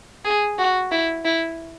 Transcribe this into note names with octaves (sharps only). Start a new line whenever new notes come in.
G#4
F#4
E4
E4